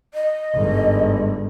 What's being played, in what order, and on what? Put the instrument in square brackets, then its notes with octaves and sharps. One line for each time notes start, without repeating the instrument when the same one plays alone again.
[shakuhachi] D#5
[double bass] G1 G#2